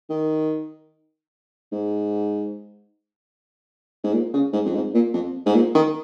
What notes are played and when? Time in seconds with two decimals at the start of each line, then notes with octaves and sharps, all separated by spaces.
0.10 D#3
1.72 G#2
4.04 G#2
4.14 A#2
4.34 C#3
4.53 G#2
4.65 F2
4.75 G#2
4.94 A#2
5.14 F2
5.46 G#2
5.55 A#2
5.75 D#3